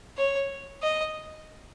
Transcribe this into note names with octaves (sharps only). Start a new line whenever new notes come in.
C#5
D#5